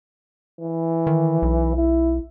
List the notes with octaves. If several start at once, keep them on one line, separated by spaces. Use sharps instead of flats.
E3
D#3
B1
E4